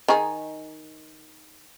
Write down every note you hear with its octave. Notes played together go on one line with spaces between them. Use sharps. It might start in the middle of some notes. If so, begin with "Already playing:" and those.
D#3 D#4 G#4